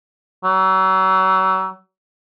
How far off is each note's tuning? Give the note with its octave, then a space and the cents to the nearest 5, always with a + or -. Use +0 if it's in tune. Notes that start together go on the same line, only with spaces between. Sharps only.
F#3 +35